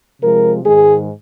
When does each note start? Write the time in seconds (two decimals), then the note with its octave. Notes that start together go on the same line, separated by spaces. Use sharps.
0.20 C3 F3 G#3 A#4
0.64 G#2 D#3 G#3 G#4